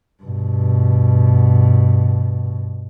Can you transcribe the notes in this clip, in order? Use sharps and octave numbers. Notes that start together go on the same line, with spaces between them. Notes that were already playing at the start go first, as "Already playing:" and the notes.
G2 B2